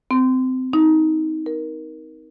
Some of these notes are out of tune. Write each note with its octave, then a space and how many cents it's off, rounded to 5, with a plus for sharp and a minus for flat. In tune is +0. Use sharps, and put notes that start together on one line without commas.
C4 -25
D#4 +20
A#4 +15